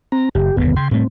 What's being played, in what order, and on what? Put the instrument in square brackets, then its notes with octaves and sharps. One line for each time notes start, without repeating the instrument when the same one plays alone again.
[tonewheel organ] C4 A#5
[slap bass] F#1 [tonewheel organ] G4
[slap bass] G1 D#2 B2 [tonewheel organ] B3
[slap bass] C#3 [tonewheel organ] G5 C6
[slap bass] A2 G3 A3 [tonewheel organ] C4